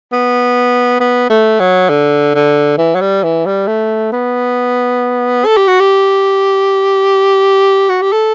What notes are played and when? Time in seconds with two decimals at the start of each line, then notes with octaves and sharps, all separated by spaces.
0.12 B3
1.00 B3
1.30 A3
1.60 F#3
1.90 D3
2.35 D3
2.78 E3
2.95 F#3
3.01 G3
3.24 E3
3.46 G3
3.68 A3
4.13 B3
5.46 A4
5.57 G4
5.68 F#4
5.80 G4
7.89 F#4
8.02 G4
8.12 A4